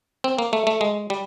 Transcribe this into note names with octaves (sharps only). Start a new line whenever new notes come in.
C4
A#3
A3
A3
G#3
G3